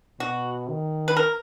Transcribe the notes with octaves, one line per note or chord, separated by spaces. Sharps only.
B2 F#4
D#3
B4
A#4